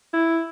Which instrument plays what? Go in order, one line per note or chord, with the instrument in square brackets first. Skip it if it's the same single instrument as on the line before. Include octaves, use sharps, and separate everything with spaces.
[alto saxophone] E4